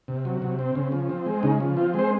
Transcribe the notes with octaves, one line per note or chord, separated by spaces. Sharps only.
C3
F#3
C3
C4
C#3
F3
C4
G#3
C#3 D#4
F3
C4 F4
G#3 C5